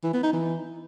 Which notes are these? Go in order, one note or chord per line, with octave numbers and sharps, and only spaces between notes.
E3
B3
D#4
E3